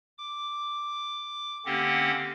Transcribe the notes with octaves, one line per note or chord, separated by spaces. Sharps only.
D6
D3 A#3 C4 C#4 G4 F#5